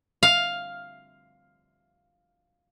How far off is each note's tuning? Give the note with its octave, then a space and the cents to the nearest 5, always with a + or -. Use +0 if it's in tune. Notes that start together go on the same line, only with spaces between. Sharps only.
F5 +5